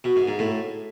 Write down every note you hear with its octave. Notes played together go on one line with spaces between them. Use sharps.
B2
G#2
G#2
A2